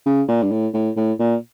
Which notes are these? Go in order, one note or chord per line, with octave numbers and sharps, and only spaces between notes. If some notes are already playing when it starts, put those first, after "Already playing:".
C#3
A#2
G2
A2
A2
A2
A#2